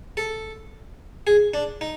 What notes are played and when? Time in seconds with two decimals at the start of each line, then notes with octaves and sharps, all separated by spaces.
0.17 A4
1.27 G#4
1.54 D4
1.81 D#4